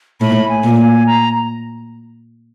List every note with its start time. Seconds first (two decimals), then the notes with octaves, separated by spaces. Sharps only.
0.21 A2 B5
0.49 G#5
0.64 A#2
0.78 G#5
1.06 A#5